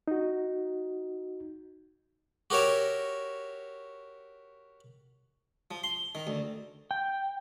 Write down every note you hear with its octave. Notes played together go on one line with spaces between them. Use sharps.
D#4 F#4
F#4 G4 A#4 C#5 E5
F3
C6
D#3
D2
G5